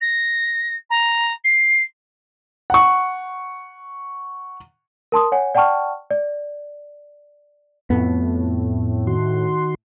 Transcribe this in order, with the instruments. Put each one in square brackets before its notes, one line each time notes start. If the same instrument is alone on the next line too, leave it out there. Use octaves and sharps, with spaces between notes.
[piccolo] A#6
A#5
C7
[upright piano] F#5 C#6
[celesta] A#4 A5 C6 D#6
C#5 F#5 G#5
D5 F#5 G5 A5 C#6 F6
D5
[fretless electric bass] F2 B3 [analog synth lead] A2
[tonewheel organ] D#3 F#4 C6